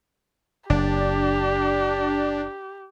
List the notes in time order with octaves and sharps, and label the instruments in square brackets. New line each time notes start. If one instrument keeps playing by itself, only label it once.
[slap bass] F#1 [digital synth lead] D4 [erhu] G4